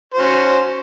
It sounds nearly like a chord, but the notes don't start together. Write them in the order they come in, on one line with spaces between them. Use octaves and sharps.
C5 F#4 C#4